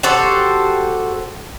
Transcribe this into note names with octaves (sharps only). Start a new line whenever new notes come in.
F#4 G4 A4 C5